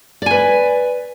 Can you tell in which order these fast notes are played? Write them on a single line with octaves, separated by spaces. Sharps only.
D5 G#5 B4